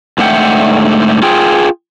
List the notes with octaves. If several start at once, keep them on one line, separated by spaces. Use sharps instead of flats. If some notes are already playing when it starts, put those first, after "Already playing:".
G#2 D3 A3 E5 F#5 G5
F4 G#4 G5